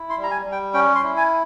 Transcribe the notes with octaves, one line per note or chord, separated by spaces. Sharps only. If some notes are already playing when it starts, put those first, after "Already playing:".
Already playing: E4
C6
G3
A#5
G#5
G3
G5
C#4 G5
C6
E4
G#5